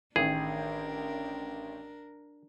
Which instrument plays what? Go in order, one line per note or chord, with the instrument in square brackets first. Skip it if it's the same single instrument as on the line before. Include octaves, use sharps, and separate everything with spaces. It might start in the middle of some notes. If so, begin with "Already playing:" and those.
[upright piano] A1 D#3 [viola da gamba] D4 A#4 [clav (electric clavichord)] G#4